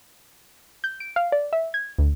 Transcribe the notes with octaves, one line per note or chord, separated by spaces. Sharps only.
G6
D7
F5
D5
E5
G#6
D2